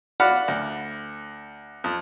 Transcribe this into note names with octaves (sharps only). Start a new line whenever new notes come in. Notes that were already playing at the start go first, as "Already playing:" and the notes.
F4 F#4 D5 F#5 B5 F6
D2
F2